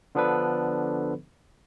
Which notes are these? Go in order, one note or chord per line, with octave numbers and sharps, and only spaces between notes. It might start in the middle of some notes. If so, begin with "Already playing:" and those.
D3 F3 B3 D4 A4 B4